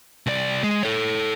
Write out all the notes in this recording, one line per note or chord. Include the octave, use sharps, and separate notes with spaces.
C2 D5
G#3
A4 C#5